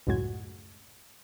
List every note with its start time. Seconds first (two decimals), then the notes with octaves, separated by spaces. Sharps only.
0.07 C#2 F#2 A2 G#3 F#4 G#6